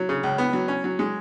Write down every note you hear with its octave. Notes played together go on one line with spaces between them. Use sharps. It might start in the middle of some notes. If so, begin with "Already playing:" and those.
Already playing: F#3
C#3
C#2
B3
F#3
C#4
F#3
G#3